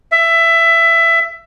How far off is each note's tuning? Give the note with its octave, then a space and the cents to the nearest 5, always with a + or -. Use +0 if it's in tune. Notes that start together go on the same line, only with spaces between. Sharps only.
E5 +15